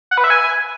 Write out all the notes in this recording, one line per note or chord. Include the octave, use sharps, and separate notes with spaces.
F#5
B4
E5
G#5